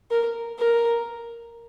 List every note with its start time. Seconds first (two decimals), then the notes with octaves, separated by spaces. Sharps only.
0.11 A#4
0.58 A#4